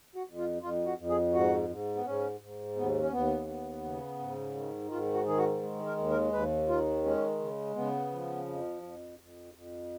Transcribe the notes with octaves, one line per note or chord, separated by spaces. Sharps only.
F#4
F2
F4
F2 F4
F#4
F2
G#4
G#2 F#4
G#2
B3
G#2 C#4
G#2
D#2 B3
C#4
D#2 B3
B3
C#3
G#2
D#3
G#2 F4
F#4
D#3 G#4
F#4
G#3
A#4
D#2
A#4
D#2 B4
D#3 F4
G#3 C#4
C#3
C#3 B3
F3
F2
F2
F2
F2